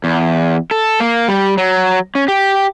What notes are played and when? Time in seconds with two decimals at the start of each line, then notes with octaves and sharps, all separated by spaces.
0.04 E2
0.71 A4
1.00 A#3
1.28 G3
1.58 F#3
2.15 C#4
2.28 G4